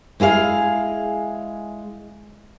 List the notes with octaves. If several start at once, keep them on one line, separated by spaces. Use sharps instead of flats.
G#3 E4 G#4 F5